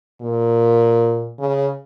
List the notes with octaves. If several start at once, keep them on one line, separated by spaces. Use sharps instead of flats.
A#2
C#3